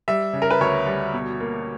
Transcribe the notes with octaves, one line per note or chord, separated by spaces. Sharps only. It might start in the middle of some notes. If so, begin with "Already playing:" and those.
G3 E5
C#3
A#4
B4
D2 C#5
G3
B2
A#3